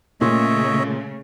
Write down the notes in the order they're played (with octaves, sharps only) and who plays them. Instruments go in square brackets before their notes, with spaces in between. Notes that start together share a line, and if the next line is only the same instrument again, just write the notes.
[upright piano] A#2 [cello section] C#3 A3 [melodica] C#5 D#5 E5